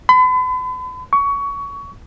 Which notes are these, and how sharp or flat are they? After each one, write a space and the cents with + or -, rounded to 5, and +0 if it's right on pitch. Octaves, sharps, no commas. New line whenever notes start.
B5 +40
C#6 +20